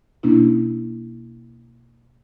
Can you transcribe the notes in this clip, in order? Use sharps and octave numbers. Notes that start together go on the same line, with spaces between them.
B2 A#3 C#4 D4 E4